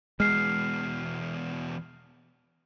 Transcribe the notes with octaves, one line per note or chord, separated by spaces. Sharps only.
E2 B2 G#3 F6 C7